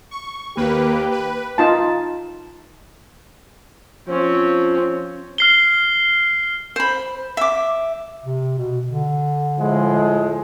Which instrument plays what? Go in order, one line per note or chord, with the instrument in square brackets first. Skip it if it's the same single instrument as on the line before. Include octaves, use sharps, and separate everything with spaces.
[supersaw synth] C#6
[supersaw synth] D#2 A#3 B4 [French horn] G4
[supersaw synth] B4
[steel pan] D#4 F4 A5
[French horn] F3 [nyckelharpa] C4 C#4
[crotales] F6 C7 G7
[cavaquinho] C5 B5
E5 D6
[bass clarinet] C3
B2
D3
[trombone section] A2 F3 G#3